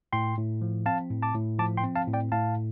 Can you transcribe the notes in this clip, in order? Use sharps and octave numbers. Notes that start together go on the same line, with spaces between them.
A2 G5 C6
A2
F3
C4 F5 A5
A2
A5 D6
A2
F3 A5 D6
G5 C6
C4
F5 A5
A2
D5 G5
A2 F5 A5